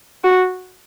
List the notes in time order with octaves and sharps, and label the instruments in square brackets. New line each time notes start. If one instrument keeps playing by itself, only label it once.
[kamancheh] F#4